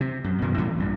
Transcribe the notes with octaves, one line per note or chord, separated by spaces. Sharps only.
C3
F#2
F#2 B2 D#3 E3
A2 E3 G3 C#4
A#1 G2 A#2